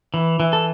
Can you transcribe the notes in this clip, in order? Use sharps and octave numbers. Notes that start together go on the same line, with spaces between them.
E3
E3
A4